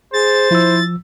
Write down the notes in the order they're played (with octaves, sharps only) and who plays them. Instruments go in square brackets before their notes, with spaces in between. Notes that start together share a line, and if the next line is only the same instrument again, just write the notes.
[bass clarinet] G#4 [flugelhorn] C5 [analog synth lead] A6
[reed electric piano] F3 E6 [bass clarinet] E4